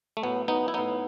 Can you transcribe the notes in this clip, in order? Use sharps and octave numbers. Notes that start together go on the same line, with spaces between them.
A3
A2 F#3 B3
B3 D#4
E4
A2 F#3 B3 D#4